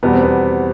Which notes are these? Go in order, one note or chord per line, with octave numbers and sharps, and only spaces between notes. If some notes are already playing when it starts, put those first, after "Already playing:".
E2 B2 G3 B3
C4
B3